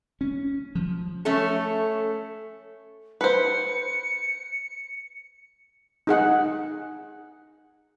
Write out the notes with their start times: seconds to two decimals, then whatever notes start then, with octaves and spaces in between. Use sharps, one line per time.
0.21 C#4
0.75 F3
1.25 A3 C#4 A4
3.21 B4 C5 C#7
6.07 D#4 G#4 F#5